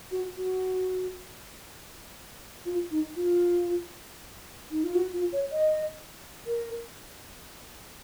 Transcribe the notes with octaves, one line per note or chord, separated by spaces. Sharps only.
F#4
F#4
F4
D#4
F4
D#4
F4
F#4
F4
C#5
D#5
A#4